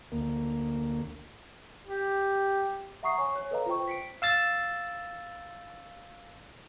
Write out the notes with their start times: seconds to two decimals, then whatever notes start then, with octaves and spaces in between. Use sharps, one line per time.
0.12 D2 A#3
1.87 G4
3.03 E5 F#5 A#5 C#6 D#6 C7
3.17 C#5 G#5 C#6
3.35 C#5
3.51 A4 B4 D#5 F5 A#5
3.66 F4 C5 G5 C#6
3.88 B6 C#7 D7
4.22 F5 E6 A6